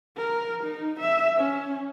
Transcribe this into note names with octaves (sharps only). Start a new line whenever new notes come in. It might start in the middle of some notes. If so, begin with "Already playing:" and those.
A#4
D#4
E5
C#4